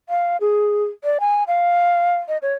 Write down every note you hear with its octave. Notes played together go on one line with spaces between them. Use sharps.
F5
G#4
D5
G#5
F5
D#5
C#5